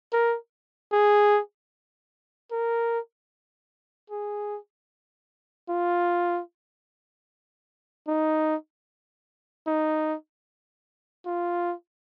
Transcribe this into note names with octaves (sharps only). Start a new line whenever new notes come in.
A#4
G#4
A#4
G#4
F4
D#4
D#4
F4